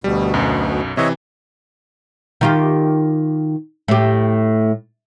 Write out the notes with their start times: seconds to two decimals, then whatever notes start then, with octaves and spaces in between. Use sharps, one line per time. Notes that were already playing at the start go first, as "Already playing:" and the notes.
0.04 D2 B2 G3
0.34 B1 F#2
0.97 C3 E3 C#5 D#5 E5
2.41 D#3 F4 G4
3.88 A2 G4